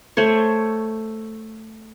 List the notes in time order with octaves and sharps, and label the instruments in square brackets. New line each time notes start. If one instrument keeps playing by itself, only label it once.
[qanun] A3 C5 C#5